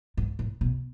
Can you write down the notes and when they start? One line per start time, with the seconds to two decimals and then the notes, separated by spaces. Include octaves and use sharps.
0.17 G#2
0.39 A2
0.61 B2